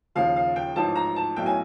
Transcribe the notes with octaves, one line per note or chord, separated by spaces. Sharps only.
D#2 C#3 F3 F5
F5
G5
A1 G#2 F3 A5
A#5
A5
B1 A2 F#3 G5
G#5